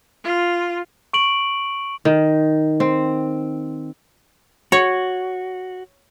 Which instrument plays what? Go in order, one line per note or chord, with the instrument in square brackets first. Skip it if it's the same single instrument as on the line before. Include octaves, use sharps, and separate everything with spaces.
[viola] F4
[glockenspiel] C#6 D7 F#7
[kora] D#3
C4
[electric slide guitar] F#4 [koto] C#5